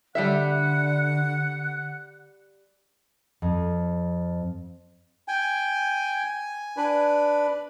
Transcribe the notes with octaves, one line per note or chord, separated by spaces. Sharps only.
D3 G3 A4 E5 F#5 F#6
F2
G5 G#5
D4 B4